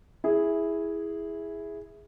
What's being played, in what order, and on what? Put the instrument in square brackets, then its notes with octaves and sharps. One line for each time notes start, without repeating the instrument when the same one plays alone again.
[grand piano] E4 G#4